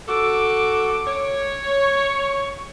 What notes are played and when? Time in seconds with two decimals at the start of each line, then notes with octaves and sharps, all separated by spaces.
0.08 F#4 A4 D6
1.07 C#5
1.76 C#6